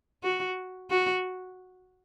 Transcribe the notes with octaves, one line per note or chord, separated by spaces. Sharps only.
F#4
F#4